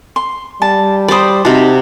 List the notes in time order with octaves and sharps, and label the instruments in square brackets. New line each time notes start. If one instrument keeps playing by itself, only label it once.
[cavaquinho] C6
[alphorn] G3 [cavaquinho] A5
[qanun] C5 D5 [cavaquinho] B5 D#6
[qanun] C3 F#4 [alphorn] D#4 [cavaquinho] A5